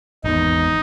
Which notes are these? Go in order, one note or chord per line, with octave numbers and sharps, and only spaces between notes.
G#1 E2 D#4